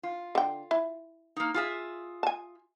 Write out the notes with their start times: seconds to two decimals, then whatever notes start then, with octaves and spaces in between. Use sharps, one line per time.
0.03 F4
0.35 D3 G5
0.71 E4
1.36 A#3 D#4
1.54 F4 G#4 E5
2.23 G#5 A5